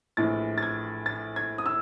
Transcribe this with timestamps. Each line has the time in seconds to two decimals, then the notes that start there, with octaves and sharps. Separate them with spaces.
0.17 A#1 A2 E3 A6
0.58 A6
0.63 G#6
1.06 A6
1.36 G#6
1.58 D#6
1.66 E6